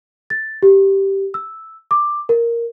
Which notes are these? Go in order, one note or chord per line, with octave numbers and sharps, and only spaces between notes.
A6
G4
E6
D6
A#4